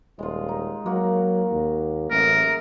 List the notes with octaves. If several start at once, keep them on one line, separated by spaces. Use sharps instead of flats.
D#1 G#3 F4
D#4
F#3 A#3 F#4
D#2
A1 F#2 G#4 A#4